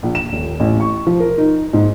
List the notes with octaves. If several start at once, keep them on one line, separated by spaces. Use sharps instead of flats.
A#1
E7
D#1
A1
C#6
F3
A#4
D#4
G#2